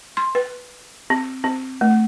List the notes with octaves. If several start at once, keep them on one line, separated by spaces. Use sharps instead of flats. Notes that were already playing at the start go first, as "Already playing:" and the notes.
C6
B4
C4
C4
A3